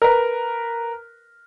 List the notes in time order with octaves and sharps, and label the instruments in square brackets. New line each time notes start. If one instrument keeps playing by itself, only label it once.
[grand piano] A#4 B4